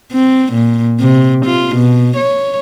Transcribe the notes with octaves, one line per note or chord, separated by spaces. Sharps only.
C4
A#2
C3
F4
B2
C#5